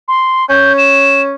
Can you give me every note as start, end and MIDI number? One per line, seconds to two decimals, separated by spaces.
0.08 0.47 84
0.49 1.35 61
0.49 0.73 91
0.78 1.21 100